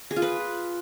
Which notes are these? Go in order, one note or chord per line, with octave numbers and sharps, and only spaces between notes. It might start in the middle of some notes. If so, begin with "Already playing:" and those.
G#4
F4
B4